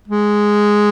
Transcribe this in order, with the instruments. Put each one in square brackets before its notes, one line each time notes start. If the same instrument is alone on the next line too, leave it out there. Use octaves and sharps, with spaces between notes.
[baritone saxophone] G#3